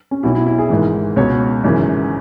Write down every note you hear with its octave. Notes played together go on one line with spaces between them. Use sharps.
C#4
B1 B2 E4
E4
E4
G#4
G#1 G#2 E3
C#2 B2 C#5
G#1 F#2 C#3 E3